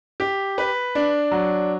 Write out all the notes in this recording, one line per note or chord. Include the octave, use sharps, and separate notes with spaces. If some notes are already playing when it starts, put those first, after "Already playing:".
G4
B4
D4
F#3